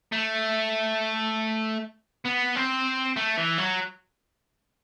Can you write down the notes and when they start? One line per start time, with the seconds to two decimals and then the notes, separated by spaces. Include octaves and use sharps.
0.12 A3
2.26 B3
2.56 C4
3.17 A3
3.38 E3
3.58 F#3